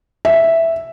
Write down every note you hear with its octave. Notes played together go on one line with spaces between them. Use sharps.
E5